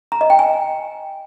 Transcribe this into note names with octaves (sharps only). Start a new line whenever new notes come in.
A#5
D#5
G5
G#5